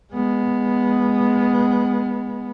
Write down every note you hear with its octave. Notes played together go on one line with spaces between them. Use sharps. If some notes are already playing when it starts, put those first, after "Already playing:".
G#3 B3